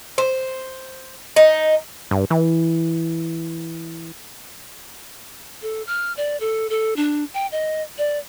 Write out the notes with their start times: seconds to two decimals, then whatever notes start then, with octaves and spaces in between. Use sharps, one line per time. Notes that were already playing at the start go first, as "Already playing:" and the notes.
0.18 C5
1.36 D#4
2.11 G2
2.30 E3
5.62 A4
5.87 F6
6.17 D5
6.40 A4
6.70 A4
6.96 D4
7.34 G5
7.52 D#5
7.98 D5